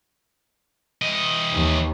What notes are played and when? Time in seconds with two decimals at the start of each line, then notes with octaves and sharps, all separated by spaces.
1.02 E3 D#5
1.53 D#2